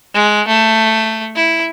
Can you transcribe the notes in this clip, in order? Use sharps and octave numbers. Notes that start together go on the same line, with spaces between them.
G#3
A3
E4